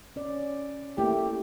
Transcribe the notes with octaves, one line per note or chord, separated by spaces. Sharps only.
C#4 D5
A3 A#3 E4 G4